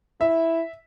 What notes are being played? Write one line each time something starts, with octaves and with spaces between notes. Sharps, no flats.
E4 E5